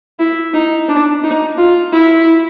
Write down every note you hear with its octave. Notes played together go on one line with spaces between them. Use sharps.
E4
D#4
D4
D#4
F4
E4